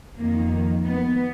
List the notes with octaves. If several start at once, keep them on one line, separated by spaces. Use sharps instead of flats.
F2 D#3 A#3
B3